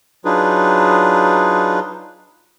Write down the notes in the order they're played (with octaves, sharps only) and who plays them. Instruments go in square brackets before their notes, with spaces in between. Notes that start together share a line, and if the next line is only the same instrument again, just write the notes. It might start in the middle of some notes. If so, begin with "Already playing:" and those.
[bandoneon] F#3 D4 D#4 F4 G#4 B4